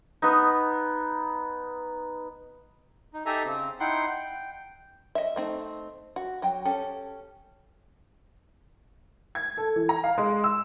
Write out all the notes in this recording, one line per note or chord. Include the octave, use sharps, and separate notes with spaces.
B3 D#4
D#4
D#4 G4 A4 E5 G#5 A#5
C#3 C4
D#4 E4 F#5 G5 C6
G5
D#5 E5
A3 C4 D#4
F#4
F#3 G5
C#4 G4 A4
G#6
A4
E3
A#5
F5
G#3
E6